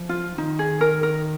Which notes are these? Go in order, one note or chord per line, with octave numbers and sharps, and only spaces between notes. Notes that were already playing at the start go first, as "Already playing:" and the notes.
Already playing: F3
F4
D#3 D#4
G#4
A#4
A#4